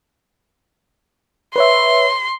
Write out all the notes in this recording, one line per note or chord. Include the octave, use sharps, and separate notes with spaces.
B4 C#5 E5 C6